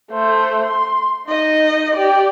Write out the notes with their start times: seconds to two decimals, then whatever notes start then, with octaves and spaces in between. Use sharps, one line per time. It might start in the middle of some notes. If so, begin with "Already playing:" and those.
0.12 A3 C5
0.65 C6
1.28 D#4 D#5
1.95 G4 D5